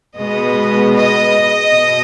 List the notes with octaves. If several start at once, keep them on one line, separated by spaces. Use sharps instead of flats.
B2 G#3 B3 D#5
D#5
B2